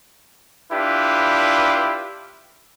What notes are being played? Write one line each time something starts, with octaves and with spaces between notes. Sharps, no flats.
D4 E4 F4 G4 B4